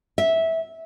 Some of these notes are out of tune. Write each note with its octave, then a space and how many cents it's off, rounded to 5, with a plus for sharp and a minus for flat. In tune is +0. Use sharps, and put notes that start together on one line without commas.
E5 -15